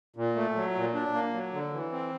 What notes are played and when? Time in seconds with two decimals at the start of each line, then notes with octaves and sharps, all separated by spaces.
0.16 A#2
0.36 A3
0.55 F#3
0.75 A#2
0.95 D4
1.13 A#3
1.34 F#3
1.53 D3
1.73 E3
1.92 C4